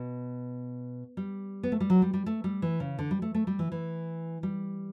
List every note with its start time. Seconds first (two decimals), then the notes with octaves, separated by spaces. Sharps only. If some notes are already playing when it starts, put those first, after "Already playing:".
Already playing: B2
1.17 G3
1.63 B3
1.72 A3
1.80 G3
1.90 F#3
2.02 G3
2.14 G3
2.26 A3
2.44 G3
2.62 E3
2.80 C#3
2.99 D3
3.11 G3
3.22 A3
3.34 A3
3.47 G3
3.59 E3
3.72 E3
4.43 G3